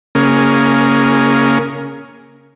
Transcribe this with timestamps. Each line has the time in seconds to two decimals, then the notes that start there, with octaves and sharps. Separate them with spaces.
0.15 C#3 A#3 C#4 G#4 A#4